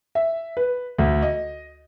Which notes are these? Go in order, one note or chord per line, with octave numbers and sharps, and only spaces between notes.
E5
B4
D2
D#5